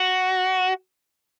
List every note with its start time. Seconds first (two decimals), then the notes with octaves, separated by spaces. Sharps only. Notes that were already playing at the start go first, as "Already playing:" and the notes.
Already playing: F#4